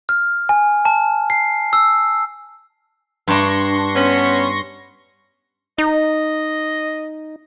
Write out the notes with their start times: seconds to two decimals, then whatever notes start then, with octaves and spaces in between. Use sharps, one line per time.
0.09 F6
0.49 G#5
0.85 A5
1.30 C7
1.73 E6
3.28 G2 D4 C6 C#6 A#6
3.95 B3 C#4
5.78 D#4 D#5